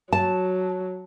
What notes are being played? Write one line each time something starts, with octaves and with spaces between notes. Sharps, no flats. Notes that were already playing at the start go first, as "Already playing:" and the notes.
F#3 A5